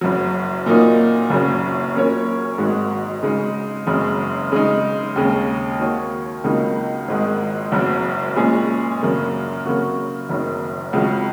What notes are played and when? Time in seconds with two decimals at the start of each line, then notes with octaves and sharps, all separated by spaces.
0.01 F#1 F#2 F#3
0.66 A#2 F#3 A#3 D#4
1.30 F#1 F#2 C#3 F#3 C#4
1.94 A#2 F#3 C#4 A#4 C#5
2.58 G#1 G#2 D#3 G#3 F#4
3.23 C#3 G#3 D#4
3.87 F#1 F#2 C#3 G#3
4.52 C#3 G#3 D#4
5.16 D#2 C#3 G#3
5.80 D#3 A#3 F#4 C#5
6.44 C#2 C#3 F#3 A#3 D#4
7.08 G#1 G#2 D#3 G#3
7.72 F#1 F#2 F#3
8.36 A#2 G#3 C#4 G#4
9.01 F#2 C#3 A#3
9.66 C#3 F#3 A#3 F#4
10.29 F#1 F#2 D#3
10.93 C#2 C#3 F#3